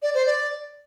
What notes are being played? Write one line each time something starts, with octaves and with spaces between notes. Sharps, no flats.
D5
C5
D5